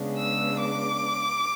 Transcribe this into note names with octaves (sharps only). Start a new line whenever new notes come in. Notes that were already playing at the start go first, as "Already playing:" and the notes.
Already playing: C#3 G#3 B3 D4
E6
D6